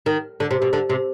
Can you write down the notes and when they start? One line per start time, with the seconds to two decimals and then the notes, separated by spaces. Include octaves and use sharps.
0.06 D#3
0.40 D3
0.51 C3
0.62 B2
0.73 D3
0.90 C3